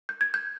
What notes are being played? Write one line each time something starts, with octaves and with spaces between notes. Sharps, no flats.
G6
G#6
G6